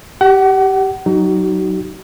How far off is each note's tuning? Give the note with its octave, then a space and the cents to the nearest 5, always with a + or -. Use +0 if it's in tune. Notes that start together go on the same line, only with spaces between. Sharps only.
G4 -10 F#5 +30
F#3 +5 D#4 +0 F#4 +35